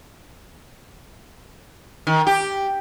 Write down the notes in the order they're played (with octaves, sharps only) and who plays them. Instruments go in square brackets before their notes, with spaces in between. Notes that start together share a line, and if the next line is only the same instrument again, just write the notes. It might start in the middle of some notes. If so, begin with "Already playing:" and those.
[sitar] D#3
G4